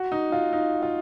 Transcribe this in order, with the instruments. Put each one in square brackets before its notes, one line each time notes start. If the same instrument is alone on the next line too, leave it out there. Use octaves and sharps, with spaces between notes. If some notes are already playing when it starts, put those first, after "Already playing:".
Already playing: [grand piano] F#4
D#4
F4
D#4
F4